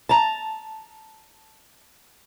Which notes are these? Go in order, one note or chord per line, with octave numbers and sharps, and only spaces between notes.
A5 A#5